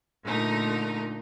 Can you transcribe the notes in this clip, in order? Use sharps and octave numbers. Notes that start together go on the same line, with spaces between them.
A#2 D3 A3 D#4 A#4